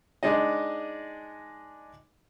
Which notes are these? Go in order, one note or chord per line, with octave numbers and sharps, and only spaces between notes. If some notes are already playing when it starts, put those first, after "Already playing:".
G#3 D4 D#4 D#5